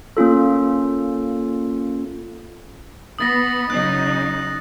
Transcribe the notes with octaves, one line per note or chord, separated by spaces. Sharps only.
A#3 C#4 F4 A4
B3 D#6 A6 A#6
C#3 F#3 D#4 F#6